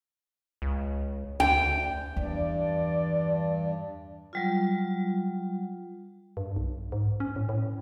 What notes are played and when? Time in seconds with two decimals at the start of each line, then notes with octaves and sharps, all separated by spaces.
0.62 C#2
1.40 D2 G5
2.17 E2 G2 D5
4.33 F#3 G3 F4
6.37 G2
6.56 B1
6.92 G#2
7.20 C#4
7.36 A2
7.49 A2